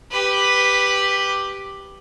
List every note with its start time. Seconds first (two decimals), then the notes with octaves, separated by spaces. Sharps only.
0.11 G4 B4